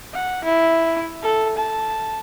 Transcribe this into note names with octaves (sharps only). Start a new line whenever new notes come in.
F#5
E4
A4
A5